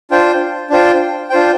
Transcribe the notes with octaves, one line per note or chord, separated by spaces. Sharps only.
D4 F4 C5 G5
D4 F4 C5 G5
D4 F4 C5 G5